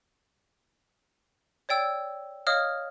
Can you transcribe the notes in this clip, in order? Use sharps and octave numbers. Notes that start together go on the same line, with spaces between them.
C#5 D5 G5 E6
C#5 D#5 F5 D#6 F6